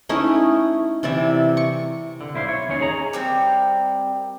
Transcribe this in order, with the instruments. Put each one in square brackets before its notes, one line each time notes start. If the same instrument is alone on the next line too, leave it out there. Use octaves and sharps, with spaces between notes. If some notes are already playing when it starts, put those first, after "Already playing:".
[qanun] A3 C#4 D#4 E4
C3 E3 D5 E5
C#6
[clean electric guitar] D3
B1 E4 C5 F5
C#5
D#2 D#3 C#4 D#4 C#5
G#4 A#5
[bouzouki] G3 C4 A#4